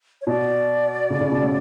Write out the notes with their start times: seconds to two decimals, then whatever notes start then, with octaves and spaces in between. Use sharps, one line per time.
0.21 C#5
0.27 B2 D5
1.10 C#3
1.21 C#3
1.31 B2
1.41 A2